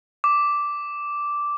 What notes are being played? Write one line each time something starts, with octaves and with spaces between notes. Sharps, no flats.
D6